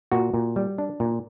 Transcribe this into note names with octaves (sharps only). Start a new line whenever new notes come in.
A#2 F#4
A#2
G3
D4
A#2